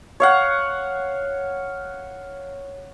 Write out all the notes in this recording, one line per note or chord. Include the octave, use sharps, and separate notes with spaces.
C#5 F5 F#5